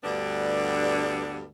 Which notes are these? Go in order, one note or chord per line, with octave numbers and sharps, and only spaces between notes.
D2 G2 D3 G3 B3 D4